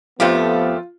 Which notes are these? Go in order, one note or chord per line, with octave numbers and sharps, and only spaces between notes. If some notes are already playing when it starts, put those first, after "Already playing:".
F2 F3 A3 B3 F4 G4